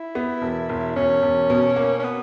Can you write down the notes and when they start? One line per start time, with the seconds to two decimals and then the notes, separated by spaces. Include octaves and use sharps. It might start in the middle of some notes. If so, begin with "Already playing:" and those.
Already playing: E4
0.15 B3
0.42 E1
0.69 E1
0.96 E1 C#4
1.22 E1
1.50 B2
1.76 A#3
1.99 C#4
2.04 B3